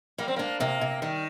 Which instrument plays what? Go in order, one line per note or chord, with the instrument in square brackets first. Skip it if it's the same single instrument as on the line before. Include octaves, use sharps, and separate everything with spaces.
[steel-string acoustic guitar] G3 [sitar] A#3
[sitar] C4
[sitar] A#3 [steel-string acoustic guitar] D4
[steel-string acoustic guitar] C3 [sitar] A#3
[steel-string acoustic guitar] C3
[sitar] D#3 [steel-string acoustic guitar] G3